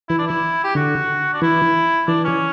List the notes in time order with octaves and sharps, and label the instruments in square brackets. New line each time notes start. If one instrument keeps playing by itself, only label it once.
[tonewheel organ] E3 [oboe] E4
[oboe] D4
E4
G4
[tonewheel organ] D3 [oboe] F#4
[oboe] D4
[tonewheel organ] E3 [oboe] E4
[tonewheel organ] E3 [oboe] D4
[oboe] C#4